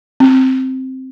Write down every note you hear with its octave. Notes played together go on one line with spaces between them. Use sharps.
C4